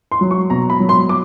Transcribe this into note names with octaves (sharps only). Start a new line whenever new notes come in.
C6
F#3
C#6
B2 A#5
B5
F#3
C6
D6